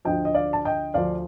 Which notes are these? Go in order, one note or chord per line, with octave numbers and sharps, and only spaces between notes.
D2 D3 F3 D#5 G5
D#5
D5 F5
A5
D#5 G5
D2 D3 F3 D5 F5